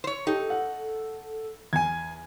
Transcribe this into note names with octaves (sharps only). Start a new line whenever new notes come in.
C5 C#5
D#4 G4 A4
F#5
E2 G#5 G#6